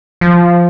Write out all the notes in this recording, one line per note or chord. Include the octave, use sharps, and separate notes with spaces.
F3